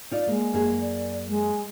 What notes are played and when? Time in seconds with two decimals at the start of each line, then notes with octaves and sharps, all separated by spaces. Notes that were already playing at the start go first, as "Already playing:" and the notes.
0.11 D#4 F4 D5
0.27 G#3 A#3
0.53 F#2 A#3 G#4
0.81 D5
1.28 G#3